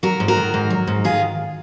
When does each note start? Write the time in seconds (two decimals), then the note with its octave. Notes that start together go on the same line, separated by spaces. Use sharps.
0.03 F#3 F#4 A#4
0.20 G#2
0.28 F#4 A#4
0.37 D#3
0.54 G#2
0.70 F#3
0.87 G#2
1.04 D#3 F4 G#4